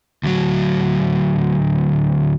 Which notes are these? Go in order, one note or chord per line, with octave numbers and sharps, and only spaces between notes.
D2 F#3